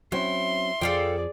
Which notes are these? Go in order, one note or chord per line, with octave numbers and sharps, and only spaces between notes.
F#3 C4 C#4 E4 C6
F2 F3 G#4 A4 D5 F5 G5